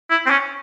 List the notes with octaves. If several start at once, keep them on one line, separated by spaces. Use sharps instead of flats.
E4
C4
C#4